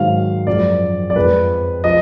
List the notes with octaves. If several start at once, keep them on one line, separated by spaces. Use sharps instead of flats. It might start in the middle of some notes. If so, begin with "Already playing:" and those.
Already playing: G#2 D#3 F#3 F5
F#2 F3 G#3 D5
D5
F2 F3 G#3 B4
F3 D#5